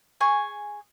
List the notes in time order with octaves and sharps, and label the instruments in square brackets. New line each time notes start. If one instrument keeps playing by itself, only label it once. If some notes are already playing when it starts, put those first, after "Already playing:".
[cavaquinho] G#4 G#5 C#6